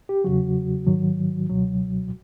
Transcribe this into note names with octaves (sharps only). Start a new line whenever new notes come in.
G4
E2 C#3 F#3 F#4
G#2 D#3 F#3
C#2 B2 F#3